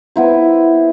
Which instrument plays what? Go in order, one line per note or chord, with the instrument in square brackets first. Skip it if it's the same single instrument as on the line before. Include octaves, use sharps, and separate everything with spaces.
[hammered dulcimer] B3 E4 C5